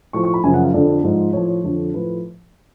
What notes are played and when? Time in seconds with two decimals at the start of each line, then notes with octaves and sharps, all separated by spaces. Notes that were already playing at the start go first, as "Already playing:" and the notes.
0.13 A2 F3 C#6
0.24 C#6
0.34 B5
0.44 F#2 C#3 F3 G#5
0.54 F#5
0.64 F5
0.74 F2 D3 F3 D5
1.04 G#2 F3
1.33 A2 F3 C#5
1.48 C#5
1.64 F2 D3 F3
1.94 A2 F3 B4